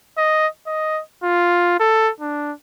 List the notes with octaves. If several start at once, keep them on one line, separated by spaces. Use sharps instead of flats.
D#5
D#5
F4
A4
D4